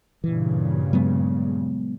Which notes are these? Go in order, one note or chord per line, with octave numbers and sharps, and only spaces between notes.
G2 A#2 C#3 E3
F#3 G#3 B3